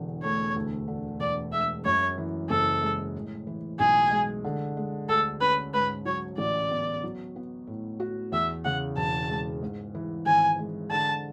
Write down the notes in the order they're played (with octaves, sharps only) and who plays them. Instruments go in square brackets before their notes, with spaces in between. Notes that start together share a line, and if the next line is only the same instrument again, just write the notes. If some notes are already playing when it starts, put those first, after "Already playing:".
Already playing: [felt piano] E1 E2 D3
[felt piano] A3 [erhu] C#5
[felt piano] D2
D3
[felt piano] E1 [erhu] D5
[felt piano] G#3 [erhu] E5
[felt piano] F#2 [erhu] C#5
[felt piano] E3
[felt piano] F#1 [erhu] A4
[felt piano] G#3
A2
E3
[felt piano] B1 [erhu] G#4
[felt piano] G#3
D3
G#3
[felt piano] D2 [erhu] A4
[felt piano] C#4 [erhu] B4
[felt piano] G#2 [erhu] B4
[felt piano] F#3 [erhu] C#5
[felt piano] A1 [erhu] D5
[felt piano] B3
F#3
B3
A2
F#4
[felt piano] E2 [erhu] E5
[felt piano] C#3 [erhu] F#5
[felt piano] E1 [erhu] A5
[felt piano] G#3
G#2
E3
[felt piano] G#1 [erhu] G#5
[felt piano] G#3
[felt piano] D3 [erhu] A5